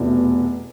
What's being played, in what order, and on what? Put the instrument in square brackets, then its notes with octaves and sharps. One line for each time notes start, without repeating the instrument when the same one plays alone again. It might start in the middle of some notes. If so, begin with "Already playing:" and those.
Already playing: [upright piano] F1 E2 B2 A3